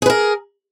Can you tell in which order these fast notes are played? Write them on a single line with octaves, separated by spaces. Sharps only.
G#4 B4 A#4